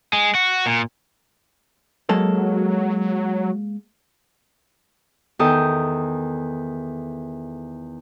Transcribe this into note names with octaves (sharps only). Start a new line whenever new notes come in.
G#3
F#4
A#2
F#3 G#3 A#3 A4
E2 D#3 A4 D#6 G6